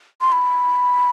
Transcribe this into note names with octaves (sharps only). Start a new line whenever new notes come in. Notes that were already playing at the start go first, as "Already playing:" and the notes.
C6
B5